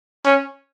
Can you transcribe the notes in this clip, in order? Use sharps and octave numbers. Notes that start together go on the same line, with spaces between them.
C#4